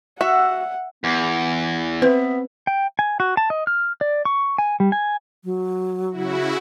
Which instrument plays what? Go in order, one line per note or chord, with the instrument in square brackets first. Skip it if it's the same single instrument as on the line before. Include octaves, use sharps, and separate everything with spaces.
[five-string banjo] F#4 [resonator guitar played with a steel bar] E5 [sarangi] F#5
[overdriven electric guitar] E2 [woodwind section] B3
[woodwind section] B3 E5 [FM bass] C4 [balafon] B4
[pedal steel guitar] G5
G#5
F#4
A5
D#5
F6
D5
C#6
G#5
G3
G#5
[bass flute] F#3
[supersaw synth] C#3 E4 F#4